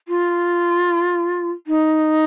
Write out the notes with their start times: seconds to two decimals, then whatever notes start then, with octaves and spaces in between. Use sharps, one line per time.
0.08 F4
1.66 D#4